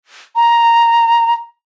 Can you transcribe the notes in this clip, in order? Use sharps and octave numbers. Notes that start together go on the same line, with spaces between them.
A#5